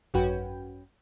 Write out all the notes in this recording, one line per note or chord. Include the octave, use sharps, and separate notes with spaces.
G#1 F#2 C#4 F#4 B4 G5